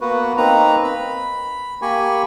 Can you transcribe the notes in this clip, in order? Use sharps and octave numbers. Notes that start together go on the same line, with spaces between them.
A#3 B3 F#4 B4
A#3 C4 D#4 B4 A#5
B5
A#3 G4 G#5 B5 C#6